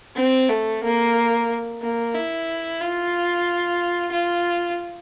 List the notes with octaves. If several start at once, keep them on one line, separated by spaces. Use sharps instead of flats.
C4
A3
A#3
A#3
E4
F4
F4